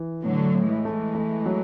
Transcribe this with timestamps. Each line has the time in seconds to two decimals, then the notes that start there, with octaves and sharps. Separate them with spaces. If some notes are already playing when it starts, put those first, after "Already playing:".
Already playing: E3
0.24 A2 D3 F#3
0.54 A2
0.69 E3 G#3
0.85 A3
1.15 A3
1.46 F#3